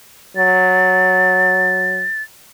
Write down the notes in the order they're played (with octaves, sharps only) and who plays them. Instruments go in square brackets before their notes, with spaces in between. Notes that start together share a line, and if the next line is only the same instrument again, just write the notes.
[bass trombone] F#3 [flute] A6